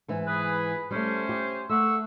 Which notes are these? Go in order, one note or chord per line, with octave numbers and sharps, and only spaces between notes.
G#2 E3
G#4 B4
G3 A3 C#4 C5
G4
A3 F#5 C#6 E6